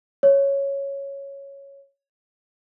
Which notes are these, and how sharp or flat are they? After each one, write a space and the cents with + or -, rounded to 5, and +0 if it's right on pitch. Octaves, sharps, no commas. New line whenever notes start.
C#5 +0